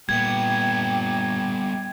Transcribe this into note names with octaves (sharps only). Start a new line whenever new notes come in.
A#2 G3 B3 G5 G#6